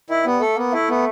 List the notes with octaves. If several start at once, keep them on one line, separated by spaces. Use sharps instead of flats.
D#3 E4
G3 B3
A3 A4
A#3 B3
A3 E4
B3